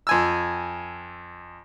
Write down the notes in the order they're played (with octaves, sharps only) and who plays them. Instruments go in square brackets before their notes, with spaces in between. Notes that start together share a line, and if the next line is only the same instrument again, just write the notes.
[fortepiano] F2 G#5 E6